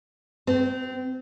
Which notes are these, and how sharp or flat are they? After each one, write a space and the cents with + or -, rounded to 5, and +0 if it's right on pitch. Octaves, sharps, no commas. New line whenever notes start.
C4 -25